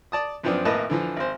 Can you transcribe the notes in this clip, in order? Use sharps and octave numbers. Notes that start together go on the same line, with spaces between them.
D5 A5 D#6
F#2 F3 B3 C4 D4
G#1 A2 A#3 B4 D#5 A5
D3 E3 F3
G#1 C5